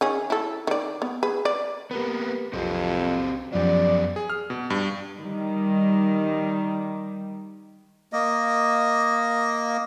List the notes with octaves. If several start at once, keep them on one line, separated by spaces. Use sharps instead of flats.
D#3 C#4 G#4
E4 A4
D#3 D5
B3
G#4 B4
D5
A#3 B3 G4 A#4 B4
B1 F2 C4 F#4 G4
F#2 F3 F#3 B3 G4 D5
G#4
F6
B2
G2
D#3 G3
A#3 D#5